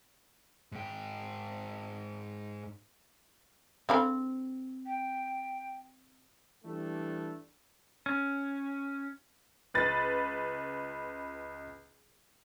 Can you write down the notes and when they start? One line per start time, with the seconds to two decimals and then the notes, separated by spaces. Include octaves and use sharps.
0.72 G#2 G5
3.89 D3 C4 F5 B5
4.86 G5
6.65 E3 G3 A3 D4
8.06 C#4
9.74 C#2 B4 A6